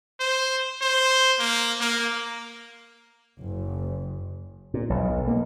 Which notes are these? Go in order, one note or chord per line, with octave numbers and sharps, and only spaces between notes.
C5
C5
A#3
A#3
F#1
A#2
B1
A#3